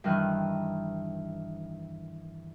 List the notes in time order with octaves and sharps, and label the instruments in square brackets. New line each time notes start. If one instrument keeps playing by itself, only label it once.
[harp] G2 D#3 E3 G3 A#4 F#6